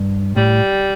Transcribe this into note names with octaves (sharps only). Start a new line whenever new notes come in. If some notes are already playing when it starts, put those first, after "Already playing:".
Already playing: G2
A2 G3